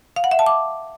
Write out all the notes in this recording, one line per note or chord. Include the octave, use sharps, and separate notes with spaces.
F5
F#5
E5
A5
D6